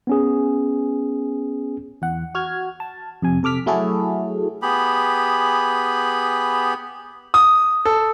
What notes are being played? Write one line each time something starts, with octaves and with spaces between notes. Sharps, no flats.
B3 C#4 G#4
E2 F#5
F#4 F6 G#6
A5
F2 C3 G#5
C3 A4 D6 F6 B6
F#3 A3 E4 F#4 G#4 A4
B3 G4 G#4 B5
D#6
A4